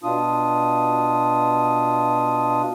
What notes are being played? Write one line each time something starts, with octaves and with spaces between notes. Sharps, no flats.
B2 D4 F4 D#6